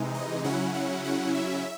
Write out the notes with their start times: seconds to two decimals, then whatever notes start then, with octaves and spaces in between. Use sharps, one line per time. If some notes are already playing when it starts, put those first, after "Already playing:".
Already playing: C3 E3 G#3 D#4
0.14 D#5
0.44 C#3 F#3 C#4 E4 F#5
0.74 F#5
1.04 F#5
1.34 E5